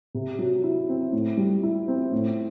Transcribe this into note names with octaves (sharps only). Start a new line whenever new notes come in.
C3
F#3
E4
C4
A2
G3
E4
C4
A2